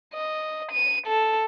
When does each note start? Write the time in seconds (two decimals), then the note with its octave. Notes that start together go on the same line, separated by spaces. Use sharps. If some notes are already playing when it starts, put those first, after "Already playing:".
0.14 D#5
0.72 D#7
1.07 A4